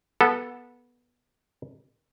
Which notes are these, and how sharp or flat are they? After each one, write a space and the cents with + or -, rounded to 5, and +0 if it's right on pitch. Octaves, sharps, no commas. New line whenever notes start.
B3 -15 A4 +0